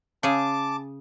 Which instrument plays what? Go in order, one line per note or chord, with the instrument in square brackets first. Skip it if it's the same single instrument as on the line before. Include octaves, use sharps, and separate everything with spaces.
[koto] C#3 G#4 [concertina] A5 D6